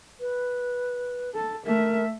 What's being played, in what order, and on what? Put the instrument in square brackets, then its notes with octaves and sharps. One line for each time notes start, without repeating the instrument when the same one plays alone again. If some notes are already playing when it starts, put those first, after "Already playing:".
[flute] B4
[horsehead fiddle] A4
[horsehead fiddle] A3 E5 [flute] A#4